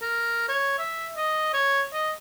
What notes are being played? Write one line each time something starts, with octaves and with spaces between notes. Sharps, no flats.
A#4
C#5
E5
D#5
C#5
D#5